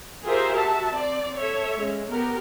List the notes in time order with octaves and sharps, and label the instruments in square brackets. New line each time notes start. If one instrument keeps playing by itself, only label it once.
[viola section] F4 G4 G#4 A#4 C5 E5
F#4 E5 A5
C4 D5
A4 C#5 E5
G#3 C#4
B3 G4 A#4